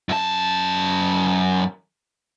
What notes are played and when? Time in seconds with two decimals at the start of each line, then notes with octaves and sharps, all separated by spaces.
0.09 F#2 A5